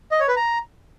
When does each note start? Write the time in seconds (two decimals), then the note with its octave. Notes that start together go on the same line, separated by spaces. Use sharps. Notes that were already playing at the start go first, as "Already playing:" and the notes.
0.11 D#5
0.20 C#5
0.28 B4
0.37 A#5